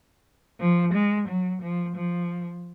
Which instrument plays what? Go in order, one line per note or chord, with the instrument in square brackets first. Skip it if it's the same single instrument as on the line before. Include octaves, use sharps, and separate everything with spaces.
[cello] F3
G#3
F#3
F3
F3